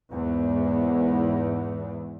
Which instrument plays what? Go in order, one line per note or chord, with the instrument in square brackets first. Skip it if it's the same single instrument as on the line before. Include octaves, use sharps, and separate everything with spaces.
[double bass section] E2 G#2